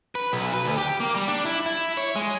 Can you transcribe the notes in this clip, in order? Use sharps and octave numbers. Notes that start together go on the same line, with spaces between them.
B4
B1
B4
D2
G4
A#3
G3
D4
E4
E4
C#5
G#3